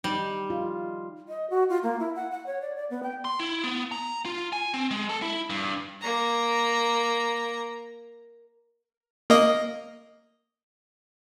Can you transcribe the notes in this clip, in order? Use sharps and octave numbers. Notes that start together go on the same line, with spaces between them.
G3 D#4
F4
D#5
F#4
F4
A#3
E4
F#5
F#5
C#5
D5
D5
B3
G5
C6
E4
B3
A#5
F4
G#5
C4
G#3
A4
E4
G2
A#3 A#5
A#3 D#5